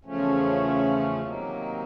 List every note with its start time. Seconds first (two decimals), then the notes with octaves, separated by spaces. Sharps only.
0.05 E2 C#3 F3 A3 C#4
1.21 C3 D#3 F#3 A#3 D#4